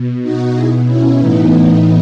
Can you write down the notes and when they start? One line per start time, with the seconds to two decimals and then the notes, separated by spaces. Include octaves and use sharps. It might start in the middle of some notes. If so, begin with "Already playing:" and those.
Already playing: B2
0.22 D#4 F#4
0.54 B2 E4 G#4
0.86 C#4 E4
1.18 A2 E3 B3 D#4